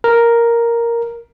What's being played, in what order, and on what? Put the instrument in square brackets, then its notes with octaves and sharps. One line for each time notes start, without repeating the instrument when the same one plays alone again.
[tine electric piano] A#4